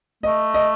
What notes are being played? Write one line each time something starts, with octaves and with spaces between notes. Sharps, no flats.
A3 D#5
D#5